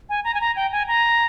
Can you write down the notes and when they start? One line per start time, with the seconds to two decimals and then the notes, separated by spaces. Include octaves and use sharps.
0.09 G#5
0.24 A#5
0.34 G#5
0.41 A#5
0.56 G5
0.72 G#5
0.88 A#5